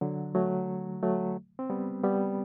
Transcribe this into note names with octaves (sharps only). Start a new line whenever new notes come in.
D3 F#3
F#3 A3
F#3 A3
C4
G3 B3
G3 B3